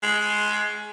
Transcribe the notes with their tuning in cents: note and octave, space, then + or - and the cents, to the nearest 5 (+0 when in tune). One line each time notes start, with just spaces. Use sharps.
G#3 +15